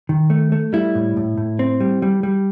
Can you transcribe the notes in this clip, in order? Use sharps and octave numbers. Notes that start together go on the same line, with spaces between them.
D#3
A3
A3
G3 E4
A2
A2
A2
C4
G3
G3
G3